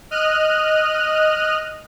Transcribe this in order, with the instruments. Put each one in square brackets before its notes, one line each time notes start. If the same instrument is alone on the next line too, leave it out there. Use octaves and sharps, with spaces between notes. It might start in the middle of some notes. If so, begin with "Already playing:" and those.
[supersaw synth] D#5 F6 F#6 D#7